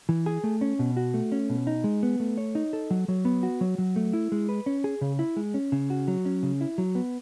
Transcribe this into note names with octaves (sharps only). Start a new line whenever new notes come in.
E3
G#4
A3
C#4
B2
F#4
A3
C#4
B2
D#4
G#3
B3
A3
C#5
D#4
A4
F#3
F#3
B3
F#4
F#3
F#3
A3
E4
G#3
B4
C#4
G#4
C#3
E4
G#3
C#4
C#3
F#4
F#3
C#4
C#3
E4
F#3
B3